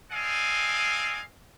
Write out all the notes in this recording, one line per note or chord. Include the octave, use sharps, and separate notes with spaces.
C4 A4 D5 D#5 F5 G#5